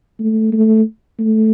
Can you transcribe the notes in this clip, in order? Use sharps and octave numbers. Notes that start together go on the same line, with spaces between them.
A3
A3
A3